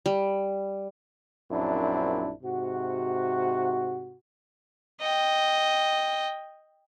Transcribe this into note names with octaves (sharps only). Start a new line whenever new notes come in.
G3
A#1 F#2 C4 D4 E4
G#2 C3 F#4
D#5 G5